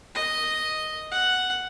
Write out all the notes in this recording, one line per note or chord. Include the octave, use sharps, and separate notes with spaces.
D#5
F#5